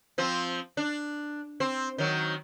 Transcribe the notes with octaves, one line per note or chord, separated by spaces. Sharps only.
F3 C4
D4
C4
D#3 F#3